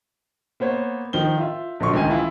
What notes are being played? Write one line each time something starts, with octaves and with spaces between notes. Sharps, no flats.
A#3 B3 C5 C#5
D#3 F3 G7
F4 E5
A#1 D3 F3 F#4 C6 C#6
C#2 D#3 G#5 D#7
E3 E4 F4